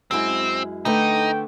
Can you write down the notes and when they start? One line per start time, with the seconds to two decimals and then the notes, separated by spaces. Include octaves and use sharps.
0.11 F#2 G#3 C4 E4
0.85 D3 A3 D#4 B4 G5